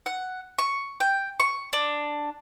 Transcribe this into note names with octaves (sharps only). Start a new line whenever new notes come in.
F#5
C#6
G5
C#6
D4